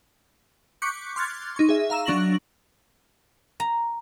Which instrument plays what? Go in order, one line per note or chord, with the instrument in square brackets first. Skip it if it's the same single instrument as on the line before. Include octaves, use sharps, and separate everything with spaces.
[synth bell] C#6 D6 F#6 G6 B6 C#7
C6 D6 F6 F#6 G#6 A6
D#4 C#6
G#4 E5
F5 A#5 E6 E7
F#3 D4 C#6 A#6 F#7
[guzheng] A#5